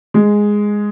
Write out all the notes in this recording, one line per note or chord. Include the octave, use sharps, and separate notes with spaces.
G#3